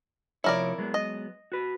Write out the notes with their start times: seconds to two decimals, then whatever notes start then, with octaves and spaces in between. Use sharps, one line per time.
0.44 C3 F3 E4 A#4 C#5 D5
0.78 F#3 G#3 B3
0.94 D#5
1.52 F#4 B4